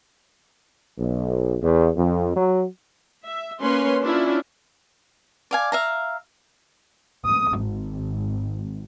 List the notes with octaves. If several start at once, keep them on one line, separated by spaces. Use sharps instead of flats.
B1
E2
F2
F#3
E5
A#3 C#4 B4 C#5 C6
C#4 D4 E4 F4
D5 F5 G#5
E5 F5 A#5
D#6
G#1